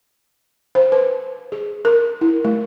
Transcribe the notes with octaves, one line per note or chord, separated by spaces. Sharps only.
C5
B4
G#4
A#4
E4
A3